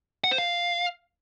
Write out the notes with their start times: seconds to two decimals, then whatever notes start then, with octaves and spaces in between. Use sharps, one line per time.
0.24 F#5
0.31 C5
0.38 F5